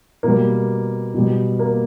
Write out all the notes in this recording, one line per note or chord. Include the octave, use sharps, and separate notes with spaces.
B2 G3 A#3
B2 G3
A#3